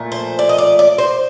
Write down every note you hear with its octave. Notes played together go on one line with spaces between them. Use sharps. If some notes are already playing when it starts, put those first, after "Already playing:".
Already playing: A#2 F3 A3
C5
D5
D#5
D5
D5
C5